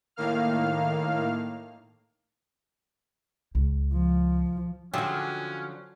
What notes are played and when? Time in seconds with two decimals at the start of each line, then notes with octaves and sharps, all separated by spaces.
0.16 A2 D#3 A#3 F5 F6
3.55 C#2
3.93 F3
4.94 D3 F3 F#3 C#4 F4 G4 G#4